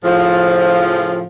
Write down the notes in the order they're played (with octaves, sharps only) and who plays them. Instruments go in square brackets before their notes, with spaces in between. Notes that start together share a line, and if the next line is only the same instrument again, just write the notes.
[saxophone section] A2 C#3 F3